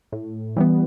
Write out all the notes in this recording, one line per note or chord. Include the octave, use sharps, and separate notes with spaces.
A2
E3 G3 B3